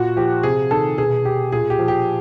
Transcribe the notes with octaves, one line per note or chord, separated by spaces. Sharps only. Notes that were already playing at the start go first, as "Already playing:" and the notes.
Already playing: A#2 F#4
F3 G4
C3 G#4
D#3 A4
B2 G#4
G4
A#2 G#4
G4
F3
G4